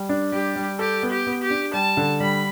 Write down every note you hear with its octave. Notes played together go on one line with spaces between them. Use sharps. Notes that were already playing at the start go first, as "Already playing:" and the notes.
Already playing: G3
D4
G3 G4
G3
G4 A4
B3
G4
B3
G4
D4
G3 A5
D3
G3 B5